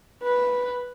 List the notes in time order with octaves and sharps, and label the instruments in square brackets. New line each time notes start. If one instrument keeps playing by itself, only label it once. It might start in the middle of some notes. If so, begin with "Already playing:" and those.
[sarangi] B4